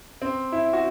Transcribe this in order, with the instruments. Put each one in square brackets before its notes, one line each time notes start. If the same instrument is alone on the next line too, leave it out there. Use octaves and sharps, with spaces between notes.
[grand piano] C4
E4
F#4